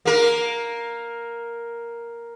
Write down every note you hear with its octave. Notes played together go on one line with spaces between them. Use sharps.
A#3 A#4